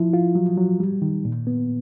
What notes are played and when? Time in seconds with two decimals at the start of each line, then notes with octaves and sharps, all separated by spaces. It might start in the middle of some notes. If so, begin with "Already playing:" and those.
Already playing: F3 E4
0.13 F4
0.35 F#3
0.58 F#3
0.80 G3
1.02 D#3
1.25 A#2
1.47 B3